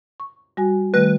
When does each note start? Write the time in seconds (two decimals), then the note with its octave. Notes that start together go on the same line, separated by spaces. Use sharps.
0.20 C#6
0.57 G3 F#4 G#5
0.94 D#3 G3 A3 B4